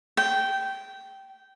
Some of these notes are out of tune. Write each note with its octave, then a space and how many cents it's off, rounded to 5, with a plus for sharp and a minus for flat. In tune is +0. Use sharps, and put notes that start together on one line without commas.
G5 -15